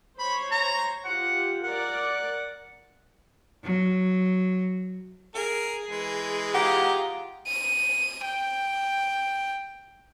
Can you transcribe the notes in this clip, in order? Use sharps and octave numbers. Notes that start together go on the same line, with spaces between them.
C5 C#5 B5
A#5
F4 G4 F#5
A#4 D5 F#5
F#3
G#4 A#4
E3 G#3
F4 G4 F#5 A#5
D#7
G5